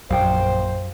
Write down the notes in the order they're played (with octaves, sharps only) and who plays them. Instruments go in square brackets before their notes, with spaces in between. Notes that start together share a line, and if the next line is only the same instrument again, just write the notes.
[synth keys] A#1 [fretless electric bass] F#2 [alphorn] C5 [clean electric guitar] F5 G5